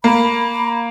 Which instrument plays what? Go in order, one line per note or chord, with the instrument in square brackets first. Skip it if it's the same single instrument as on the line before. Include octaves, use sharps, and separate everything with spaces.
[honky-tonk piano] A#3 [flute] B5